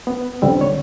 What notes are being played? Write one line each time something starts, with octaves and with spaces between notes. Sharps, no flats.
B3
C#2 D3 G3 C4
C#5